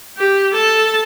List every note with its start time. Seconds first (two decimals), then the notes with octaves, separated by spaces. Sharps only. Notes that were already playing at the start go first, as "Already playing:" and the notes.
0.18 G4
0.54 A4 A5